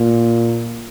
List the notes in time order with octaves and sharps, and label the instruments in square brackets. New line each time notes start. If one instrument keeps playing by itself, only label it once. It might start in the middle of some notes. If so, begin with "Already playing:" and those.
Already playing: [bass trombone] A#2